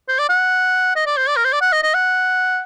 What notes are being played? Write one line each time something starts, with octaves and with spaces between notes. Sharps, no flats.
C5
D5
F#5
D#5
D5
C5
D5
A#4
C5
D5
F#5
D#5
D#5
F#5